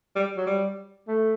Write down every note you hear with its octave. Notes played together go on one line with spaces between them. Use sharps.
G3
F#3
G3
A3